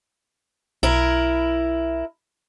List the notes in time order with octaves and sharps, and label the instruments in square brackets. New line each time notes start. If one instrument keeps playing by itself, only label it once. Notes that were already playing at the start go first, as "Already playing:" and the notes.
[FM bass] B1 [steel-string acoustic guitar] E4 A#4